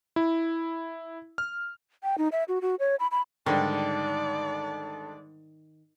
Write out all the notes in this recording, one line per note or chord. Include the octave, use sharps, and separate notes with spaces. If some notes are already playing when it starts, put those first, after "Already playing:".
E4
F6
G5
D#4
E5
F#4
F#4
C#5
B5
B5
G#2 D3 D#3 G3 D5 A5